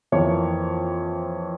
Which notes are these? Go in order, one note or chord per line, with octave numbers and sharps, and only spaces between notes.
F2 E3 A#3 C#5